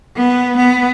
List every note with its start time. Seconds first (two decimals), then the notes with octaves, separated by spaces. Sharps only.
0.16 B3
0.57 B3